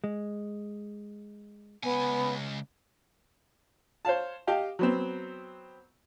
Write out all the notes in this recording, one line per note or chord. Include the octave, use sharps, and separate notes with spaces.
G#3
C#2 B3 G#5
C5 C#5 F5 A5
G4 D#5 F5 G5 A5
F#3 B3 C4